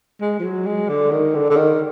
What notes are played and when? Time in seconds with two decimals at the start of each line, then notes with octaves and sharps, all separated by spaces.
0.21 G#3
0.39 F3
0.44 F#3
0.66 G#3
0.89 D3
1.11 D#3
1.35 D3
1.50 D3
1.56 D#3